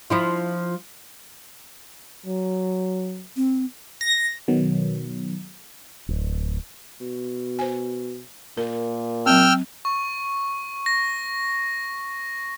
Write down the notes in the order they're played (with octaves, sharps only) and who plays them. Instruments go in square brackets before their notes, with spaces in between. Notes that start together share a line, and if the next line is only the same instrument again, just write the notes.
[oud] F3 E4 F4
[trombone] F#3
[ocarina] C4
[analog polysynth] A#6
[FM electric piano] B2 D#3 F#3
[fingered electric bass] D1
[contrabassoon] B2
[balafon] C5 G#5
[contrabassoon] A#2 [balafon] A#4
[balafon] F#3 C4 [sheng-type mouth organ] G5 E6 F6
[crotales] C#6
A#6